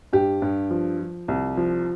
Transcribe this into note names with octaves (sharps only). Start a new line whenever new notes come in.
G2 G4
G2
F3
F3
C2
F3